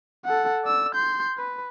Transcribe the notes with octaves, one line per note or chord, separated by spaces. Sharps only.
A4 F#5
D5 E6
C6 G6
B4